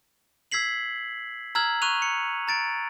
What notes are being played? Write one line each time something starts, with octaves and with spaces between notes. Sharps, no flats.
E6 G#6 B6 C7 F#7
A#5 E6 F6 G#6 F#7
C#6 F#6 D#7 F7
C#7
A#5 A6 D7